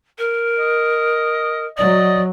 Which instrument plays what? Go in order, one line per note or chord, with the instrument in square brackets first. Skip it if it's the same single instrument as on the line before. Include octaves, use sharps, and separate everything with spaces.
[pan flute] A#4
[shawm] D#5
[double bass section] F#3 [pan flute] D5 [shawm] D#5